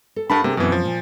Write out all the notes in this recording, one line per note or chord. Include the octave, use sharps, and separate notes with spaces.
A4
G2 D4 A#4 F#5 A5 B5
C3 A#3 D4 G#4
F#2 B2 E3 C4
F3
A#2